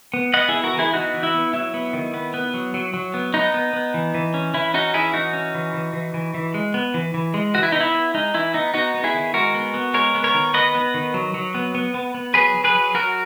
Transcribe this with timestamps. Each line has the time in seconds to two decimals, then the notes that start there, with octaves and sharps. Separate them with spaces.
0.14 B3
0.34 B3 D#5 F#5
0.49 B3 E4 G#4
0.64 F#4 A#4
0.74 E3
0.79 E4 G#4
0.93 B3 D#4 F#4
1.14 E3
1.23 E4
1.34 B3
1.54 F#3 E4
1.74 B3
1.93 D#3
2.14 B3
2.34 B3
2.54 F#3
2.74 F#3
2.94 F#3
3.14 B3
3.34 B3 D#4
3.54 B3
3.73 B3
3.94 E3
4.15 E3
4.34 C#4
4.54 E3 E4
4.74 C#4 D#4 F#4
4.94 E3 E4 G#4
5.14 E3 D#4 F#4
5.33 C#4
5.55 E3
5.74 E3
5.93 E3
6.14 E3
6.34 E3
6.54 G#3
6.74 B3
6.94 E3
7.14 E3
7.34 G#3
7.54 E3 F#4
7.63 E4
7.72 B3 D#4
7.81 E4
7.94 B3
8.14 G#3 D#4
8.34 E3 E4
8.54 B3 D#4
8.74 B3 D#4 F#4
8.94 B3
9.04 E4 G#4
9.14 D#3
9.34 G#3 F#4 A#4
9.54 B3
9.74 B3
9.94 G#3 A#4 C#5
10.15 B3
10.24 A#4 C#5
10.34 D#3
10.54 B3 B4 D#5
10.75 B3
10.94 D#3
11.14 F#3
11.34 F#3
11.54 B3
11.75 B3
11.94 B3
12.15 B3
12.34 F#3 G#4 B4
12.54 F#3
12.64 G#4 B4
12.75 F#3
12.95 F#3 F#4 A#4